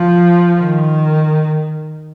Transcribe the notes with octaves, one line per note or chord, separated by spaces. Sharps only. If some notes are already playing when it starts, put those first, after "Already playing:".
Already playing: F3
D#3